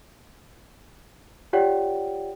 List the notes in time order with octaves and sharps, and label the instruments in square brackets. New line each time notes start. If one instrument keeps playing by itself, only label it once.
[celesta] F4 G4 C#5 D5 F#5 G5